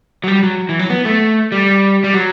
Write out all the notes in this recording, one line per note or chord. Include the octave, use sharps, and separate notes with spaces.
F#3
G3
F#3
E3
F#3
B3
A3
G3
G3
F#3